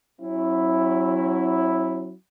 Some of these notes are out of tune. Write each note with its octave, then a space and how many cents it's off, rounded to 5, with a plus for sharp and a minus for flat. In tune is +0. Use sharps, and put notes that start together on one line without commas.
F#3 +0 C4 +45 E4 +0